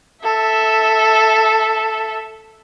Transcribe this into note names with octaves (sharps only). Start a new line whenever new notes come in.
A4 E5